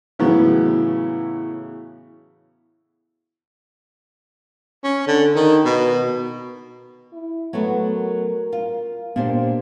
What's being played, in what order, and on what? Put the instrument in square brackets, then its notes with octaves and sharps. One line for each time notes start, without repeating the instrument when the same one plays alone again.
[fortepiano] A2 C#3 E3 F#3 B3
[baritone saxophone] C#4
D3
D#3
B2
[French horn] E4
[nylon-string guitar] F#3 A3 [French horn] B3
[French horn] A#4
[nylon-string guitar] F4
[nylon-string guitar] A#2 D4 C5 [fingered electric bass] B3 [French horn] G4